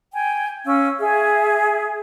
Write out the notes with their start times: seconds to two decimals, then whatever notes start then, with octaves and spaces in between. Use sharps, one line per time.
0.14 G5 G#5
0.64 C#4 F5 E6
0.99 G#4 E5 G#5